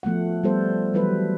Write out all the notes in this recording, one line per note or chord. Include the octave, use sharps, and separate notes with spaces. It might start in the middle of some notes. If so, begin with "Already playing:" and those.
F3 A3 B3 F#5
G3 B3 A4 C5
E3 F#3 G3 E4 B4